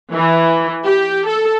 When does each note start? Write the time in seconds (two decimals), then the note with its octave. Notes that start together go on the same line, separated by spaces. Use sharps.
0.12 E3
0.84 G4
1.28 A4